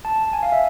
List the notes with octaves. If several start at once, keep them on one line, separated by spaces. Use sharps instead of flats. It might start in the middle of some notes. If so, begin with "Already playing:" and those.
A5
G#5
F5
E5